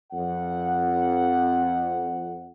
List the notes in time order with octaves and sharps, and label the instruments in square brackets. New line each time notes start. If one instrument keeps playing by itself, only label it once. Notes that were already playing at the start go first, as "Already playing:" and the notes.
[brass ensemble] F2 F#5